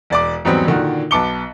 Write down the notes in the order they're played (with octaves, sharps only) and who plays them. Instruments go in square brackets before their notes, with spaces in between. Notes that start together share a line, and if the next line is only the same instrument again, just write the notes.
[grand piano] E1 D5 D6
E2 G#2 F#3 G3 B3 C4
A#2 D3 D#3 F#4
B1 B3 A5 D6 C#7 G7